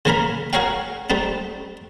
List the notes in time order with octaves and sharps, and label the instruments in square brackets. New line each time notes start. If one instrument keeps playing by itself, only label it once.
[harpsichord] C#3 E3 A#3 A#4 A#5 B5
F#4 G#4 A#4 C#5 F5 G5
G3 A3 C4 D#4